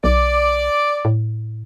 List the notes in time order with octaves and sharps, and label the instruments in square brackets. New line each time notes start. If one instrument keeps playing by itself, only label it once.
[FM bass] B1 [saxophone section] D5
[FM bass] A2